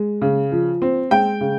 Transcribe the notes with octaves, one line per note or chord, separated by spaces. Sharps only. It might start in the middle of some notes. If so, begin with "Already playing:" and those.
Already playing: G#3
C#3
F3
C4
G#3 G5
C#3